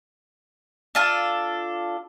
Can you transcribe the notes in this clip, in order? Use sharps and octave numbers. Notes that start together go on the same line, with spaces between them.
D4 F4 A4